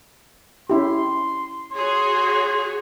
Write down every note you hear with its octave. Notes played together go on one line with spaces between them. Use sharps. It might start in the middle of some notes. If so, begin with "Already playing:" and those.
C#4 E4 G4 C6
F#4 G#4 C#5 C6